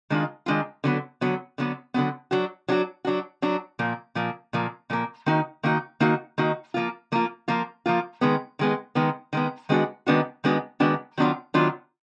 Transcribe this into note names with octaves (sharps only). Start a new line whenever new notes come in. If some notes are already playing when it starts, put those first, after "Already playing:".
D#3 G#3 D4 F4
D#3 G#3 D4 F4
D3 F#3 B3
D3 F#3 B3
D3 F#3 B3
D3 F#3 B3
F#3 D4 F#4
F#3 D4 F#4
F#3 D4 F#4
F#3 D4 F#4
A#2 F3 A#3
A#2 F3 A#3
A#2 F3 A#3
A#2 F3 A#3
D#3 A#3 D#4 F#4
D#3 A#3 D#4 F#4
D#3 A#3 D#4 F#4
D#3 A#3 D#4 F#4
F3 A#3 F4
F3 A#3 F4
F3 A#3 F4
F3 A#3 F4
D#3 G#3 B3
D#3 G#3 B3
D#3 G#3 B3
D#3 G#3 B3
D#3 G#3 B3 D4 F#4
D#3 G#3 B3 D4 F#4
D#3 G#3 B3 D4 F#4
D#3 G#3 B3 D4 F#4
D#3 F#3 B3 D4 F4
D#3 F#3 B3 D4 F4